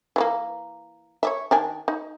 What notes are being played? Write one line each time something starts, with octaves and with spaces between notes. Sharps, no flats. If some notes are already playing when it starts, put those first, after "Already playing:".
E3 A3 A#3
C#5 D5 E5
D#3 D4 G#5
D#4